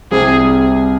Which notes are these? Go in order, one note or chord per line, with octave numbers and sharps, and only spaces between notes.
C2 C3 G3 C4 G#4